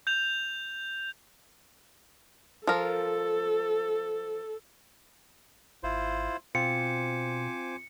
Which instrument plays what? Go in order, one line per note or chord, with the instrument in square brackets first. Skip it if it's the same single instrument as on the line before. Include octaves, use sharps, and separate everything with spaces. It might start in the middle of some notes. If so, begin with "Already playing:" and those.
[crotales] G6 F7
[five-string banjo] F3 A#4 [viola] A4
[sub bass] G#1 [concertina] E4 F4 C5
[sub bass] B2 [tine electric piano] C4 F4 [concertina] C5 G#5 D6 [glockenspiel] C#7